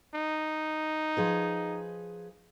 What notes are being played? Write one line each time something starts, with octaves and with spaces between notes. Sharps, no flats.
D#4
F3 G#4 B4